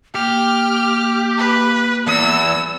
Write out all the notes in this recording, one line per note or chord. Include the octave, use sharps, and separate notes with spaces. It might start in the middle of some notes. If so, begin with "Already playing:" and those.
A#3 G4 F6
B4
E2 E6